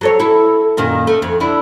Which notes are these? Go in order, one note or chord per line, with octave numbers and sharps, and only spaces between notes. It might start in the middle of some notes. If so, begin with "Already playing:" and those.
F#3 A4 C#5
E4 A4
F#2 A#2 D#3
A3
F2
D3 D4 E4